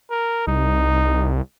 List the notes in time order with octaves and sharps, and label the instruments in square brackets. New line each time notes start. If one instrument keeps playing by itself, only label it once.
[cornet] A#4
[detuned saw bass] C2 [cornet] D#4